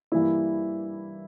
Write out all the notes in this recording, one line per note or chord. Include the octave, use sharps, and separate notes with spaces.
G2 E3 A#3 E4